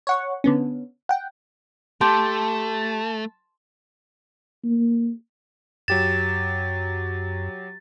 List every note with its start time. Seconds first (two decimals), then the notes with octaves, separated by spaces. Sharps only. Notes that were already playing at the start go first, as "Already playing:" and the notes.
0.07 C#5 F#5 C#6
0.44 D3 B3 C#4
1.09 F#5 G5
2.01 A3 G4 A5 C6
4.64 A#3
5.88 F#2 F#3 G4 A6 E7